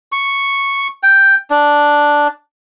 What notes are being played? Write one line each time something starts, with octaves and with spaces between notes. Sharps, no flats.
C#6
G5
D4